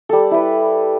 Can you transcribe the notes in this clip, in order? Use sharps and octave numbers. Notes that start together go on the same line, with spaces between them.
G3 A4
E4 B4